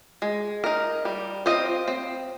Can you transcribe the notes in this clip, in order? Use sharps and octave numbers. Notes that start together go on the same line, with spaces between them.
G#3
D#4 A#4
G3
C4 F4 C5 D#5
C4